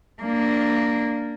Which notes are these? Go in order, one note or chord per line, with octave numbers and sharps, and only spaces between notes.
A#3 D4